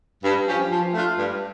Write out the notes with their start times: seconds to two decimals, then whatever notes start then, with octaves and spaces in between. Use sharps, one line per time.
0.23 G2
0.47 F3 C#4 G4
0.70 F3
0.94 A3 D4 F4
1.17 G2